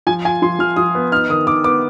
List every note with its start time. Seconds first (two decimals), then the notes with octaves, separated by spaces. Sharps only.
0.07 F3 G#5
0.25 F4 G#5
0.42 F3 C6
0.59 F3 F6
0.76 F3 D#6
0.95 B3
1.12 D#4 F6
1.29 D#3 D#6
1.47 D#3 D6
1.64 B3 D6